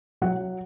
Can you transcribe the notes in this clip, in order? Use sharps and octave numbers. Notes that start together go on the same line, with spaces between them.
F#3 F#5